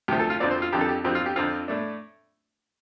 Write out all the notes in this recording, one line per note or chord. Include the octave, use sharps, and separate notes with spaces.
D2 C3 F3 G4
A4
F4
F2 D3 F3 C4 D5
C5
F4
F2 D3 F3 C4 G4
A4
G4
F2 D3 F3 C4 G4
F4
G4
F2 D3 F3 C4 F4
A2 A3 D4